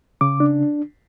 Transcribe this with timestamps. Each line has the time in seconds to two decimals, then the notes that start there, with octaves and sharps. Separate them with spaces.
0.21 C#3 D6
0.40 D4